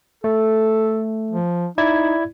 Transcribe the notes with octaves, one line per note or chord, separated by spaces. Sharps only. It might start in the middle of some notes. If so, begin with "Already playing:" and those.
A3 A4
F3
D#4 E4 D5 G#6